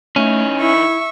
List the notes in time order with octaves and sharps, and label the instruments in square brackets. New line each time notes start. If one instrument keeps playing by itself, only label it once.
[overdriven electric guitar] E3 D#4 [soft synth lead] A3 [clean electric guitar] C#4
[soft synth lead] E4 [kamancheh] E5 C#6